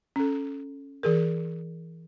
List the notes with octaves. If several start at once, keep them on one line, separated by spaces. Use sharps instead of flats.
C#4 A4
E3 G#4 A#4